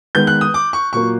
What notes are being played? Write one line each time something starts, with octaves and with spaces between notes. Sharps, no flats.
D#3 G#3 B3 G6
F#6
D#6
D6
C#6
A#2 F#3 A#3 C#6